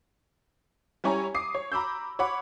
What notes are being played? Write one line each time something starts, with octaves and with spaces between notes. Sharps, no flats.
G3 C#4 E4 C#5 G#5 A#5
D6 D#6 C7
C#5
A#5 B5 D6 E6 G6
C#5 F#5 B5 D6